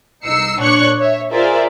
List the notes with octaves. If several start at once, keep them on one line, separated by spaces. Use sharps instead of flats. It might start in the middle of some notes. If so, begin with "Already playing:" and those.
C2 D#4 E6 C7 C#7
A#2 D4 C#5 C#6 F#6 C#7
C#5 E5
F4 G#4 A#4 C5 D5 E5